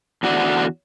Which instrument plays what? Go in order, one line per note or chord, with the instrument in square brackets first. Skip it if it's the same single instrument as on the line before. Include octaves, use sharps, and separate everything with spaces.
[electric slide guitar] E2 D3 F#4 D5